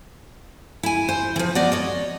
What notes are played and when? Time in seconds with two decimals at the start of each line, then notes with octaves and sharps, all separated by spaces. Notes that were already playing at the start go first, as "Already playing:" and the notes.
0.83 E4 G#5
1.09 C5
1.36 E3 F3
1.55 B3 D5 D#5
1.72 C#5 D#5